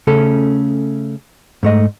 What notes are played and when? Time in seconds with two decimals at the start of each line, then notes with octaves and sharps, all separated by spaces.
0.07 C#3 A3 C#4 A4
1.63 G#2 A3 D#5